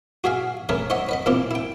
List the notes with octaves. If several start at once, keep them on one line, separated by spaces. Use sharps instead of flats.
F#4 G#4 E5 F5
A3 C#4 G#4 A#4 B4
C5 C#5 D#5 E5 F#5
B4 D#5 B5
A#2 G3 A#3 C4 E4 G4
E4 G5